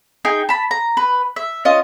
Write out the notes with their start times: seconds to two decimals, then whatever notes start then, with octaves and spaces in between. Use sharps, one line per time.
0.25 D#4 G#4 G5
0.49 A5 B5
0.71 A#5
0.97 B4
1.36 E5
1.65 C#4 F4 D#5